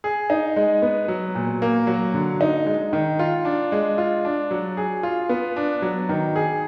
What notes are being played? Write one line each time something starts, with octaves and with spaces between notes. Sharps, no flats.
G#4
D#4
G#3
B3
F#3
A#2
A#3
F#3
D3
D#4
G#3
D#3
F4
D4
G#3
F4
D4
F#3
G#4
F4
B3
D4
F#3
D#3
G#4